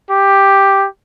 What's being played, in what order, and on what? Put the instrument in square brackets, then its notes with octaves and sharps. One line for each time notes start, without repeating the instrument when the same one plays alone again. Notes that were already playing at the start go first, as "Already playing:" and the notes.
[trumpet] G4